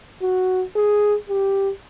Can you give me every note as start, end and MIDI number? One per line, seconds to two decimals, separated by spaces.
0.22 0.63 66
0.76 1.14 68
1.29 1.70 67